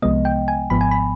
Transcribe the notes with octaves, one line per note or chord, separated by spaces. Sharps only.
C2 C3 F3 G#3 B3 D#5
G5
G#5
G#1 G#2 F3 B3 B5
G#5
B5